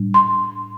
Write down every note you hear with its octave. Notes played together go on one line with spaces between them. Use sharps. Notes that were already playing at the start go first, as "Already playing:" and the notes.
Already playing: A2 G3 D4
C6